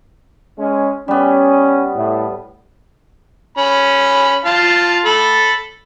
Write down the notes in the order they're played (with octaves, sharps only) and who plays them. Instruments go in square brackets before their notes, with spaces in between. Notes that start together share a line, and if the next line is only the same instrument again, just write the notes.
[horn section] G#3 C#4
[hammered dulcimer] G3 B3 [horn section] C#4
[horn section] A2
[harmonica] C#4 B5
F4 F5 A5
A4 B5